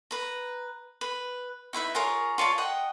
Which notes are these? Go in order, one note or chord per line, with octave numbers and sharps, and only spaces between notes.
B4 A#5
B4
D#4 E4 B4 E5
F4 G#4 A#4 C#5
F4 C#5 D5 A5
D#5 F#5 G5